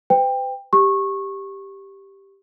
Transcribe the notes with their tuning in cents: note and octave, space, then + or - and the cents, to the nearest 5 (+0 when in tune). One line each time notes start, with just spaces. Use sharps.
B4 +45 G5 +15
G4 +0 C#6 -20